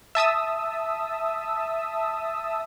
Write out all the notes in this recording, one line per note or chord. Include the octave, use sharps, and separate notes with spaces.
E5 A5 D#6 E6